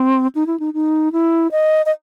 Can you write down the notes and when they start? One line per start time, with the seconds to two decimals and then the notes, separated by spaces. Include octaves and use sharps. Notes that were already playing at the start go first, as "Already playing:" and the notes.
Already playing: C4
0.35 D#4
0.47 E4
0.60 D#4
0.74 D#4
1.13 E4
1.52 D#5
1.86 D#5